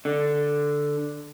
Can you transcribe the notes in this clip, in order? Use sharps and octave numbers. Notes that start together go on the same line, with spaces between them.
D3